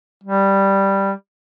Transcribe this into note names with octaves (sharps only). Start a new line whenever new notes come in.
G3